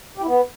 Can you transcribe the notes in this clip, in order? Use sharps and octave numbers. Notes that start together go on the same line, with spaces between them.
G4
E4
B3